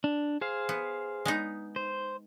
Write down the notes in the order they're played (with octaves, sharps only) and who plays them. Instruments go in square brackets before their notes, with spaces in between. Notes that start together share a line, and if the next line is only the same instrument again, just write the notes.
[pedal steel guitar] D4
G#4 C5 F5
[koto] B3
G#3 B3 D#4
[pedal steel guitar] C5